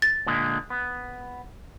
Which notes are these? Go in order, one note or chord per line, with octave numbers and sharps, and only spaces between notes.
A6
A#2 D3 G#3
B3